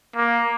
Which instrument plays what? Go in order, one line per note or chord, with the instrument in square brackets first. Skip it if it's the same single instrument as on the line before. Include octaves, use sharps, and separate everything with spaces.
[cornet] A#3